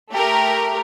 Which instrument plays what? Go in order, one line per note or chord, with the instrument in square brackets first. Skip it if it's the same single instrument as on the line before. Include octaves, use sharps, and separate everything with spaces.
[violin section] A3 G4 A#4